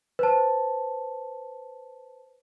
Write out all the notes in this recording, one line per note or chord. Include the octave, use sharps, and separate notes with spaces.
B4 C5 A5